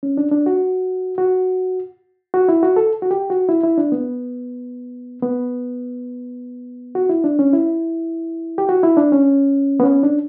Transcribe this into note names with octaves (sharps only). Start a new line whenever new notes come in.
C#4
D4
D4
F#4
F#4
F#4
E4
F#4
A4
F#4
G4
F#4
E4
E4
D4
B3
B3
F#4
E4
D4
C#4
E4
G4
F#4
E4
D4
C#4
B3
C#4
D4